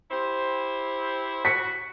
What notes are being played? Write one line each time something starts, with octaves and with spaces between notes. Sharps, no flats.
E4 G4 C5
F#4 B6 C#7